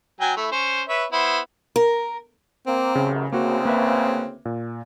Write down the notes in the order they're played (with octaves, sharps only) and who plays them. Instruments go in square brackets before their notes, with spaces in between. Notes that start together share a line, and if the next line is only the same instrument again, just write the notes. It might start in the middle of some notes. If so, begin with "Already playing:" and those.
[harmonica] F#3 G5 G#5
A3 E4
C#4 C5
B4 C#5 E5
B3 E4 C5
[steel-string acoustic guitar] A#4
[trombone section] A#3 [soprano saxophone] C4
[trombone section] A1 F#2 [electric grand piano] C#3
[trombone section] D2 C#3 [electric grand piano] A#3 F#4 [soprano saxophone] C4
[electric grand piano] A#3 B4 E5
A#2